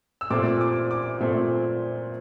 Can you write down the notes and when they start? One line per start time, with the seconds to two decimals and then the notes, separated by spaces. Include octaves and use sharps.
0.21 E6
0.30 A#2 A3 C4 D6
0.61 D6
0.91 D6
1.20 A#2 A3 C4